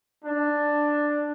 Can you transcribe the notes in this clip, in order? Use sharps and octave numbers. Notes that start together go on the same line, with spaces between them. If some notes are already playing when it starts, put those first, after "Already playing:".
D4